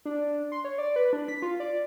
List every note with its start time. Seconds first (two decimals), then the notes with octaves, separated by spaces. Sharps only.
0.05 D4
0.52 C6
0.65 C#5
0.78 D5
0.96 B4
1.13 D4
1.28 B6
1.42 F4
1.60 D5